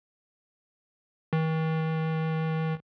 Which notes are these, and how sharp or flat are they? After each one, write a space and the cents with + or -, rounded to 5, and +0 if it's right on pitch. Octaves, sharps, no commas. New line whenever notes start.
D#3 +45